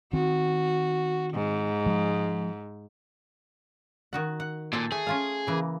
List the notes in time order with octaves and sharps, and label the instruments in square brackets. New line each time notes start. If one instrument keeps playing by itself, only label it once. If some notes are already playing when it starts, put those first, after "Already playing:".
[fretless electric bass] D#3 C4 [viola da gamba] F#4
[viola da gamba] G#2
[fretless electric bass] F3 G#3
[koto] D#3 F#4 F#5
F#5
[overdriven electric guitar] A#2 [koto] A4 C5 G#5
[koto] A3 [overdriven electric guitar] G#4
[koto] C#4 F4 F5
C#3 E3 A#3